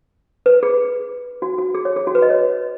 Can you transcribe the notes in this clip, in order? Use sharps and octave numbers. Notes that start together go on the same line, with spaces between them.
B4
G#4
F#4
F#4
G#4
C#5
G#4
F#4
B4
D#5
C#5